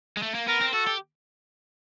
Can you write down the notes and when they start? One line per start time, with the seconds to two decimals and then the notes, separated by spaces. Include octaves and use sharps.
0.17 G#3
0.23 A3
0.35 A#3
0.47 B3 A#4
0.61 C4
0.73 F#4 A4
0.87 G4